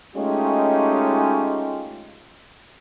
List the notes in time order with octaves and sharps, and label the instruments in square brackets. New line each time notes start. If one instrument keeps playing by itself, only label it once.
[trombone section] G#3 A3 C#4 D#4 F4 G4